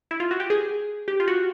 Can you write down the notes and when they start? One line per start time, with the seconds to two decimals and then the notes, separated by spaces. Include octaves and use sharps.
0.11 E4
0.20 F4
0.31 F#4
0.40 G4
0.50 G#4
1.08 G4
1.20 F4
1.28 F#4